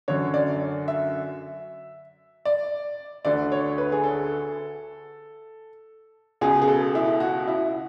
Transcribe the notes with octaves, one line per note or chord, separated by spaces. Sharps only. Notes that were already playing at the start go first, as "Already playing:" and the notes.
F#2 D3 C#5
D5
E5
D5
D2 D3 D5
C#5
B4
G#4
A4
C#2 B2 G#4
G#4
A4
E4
F#4
E4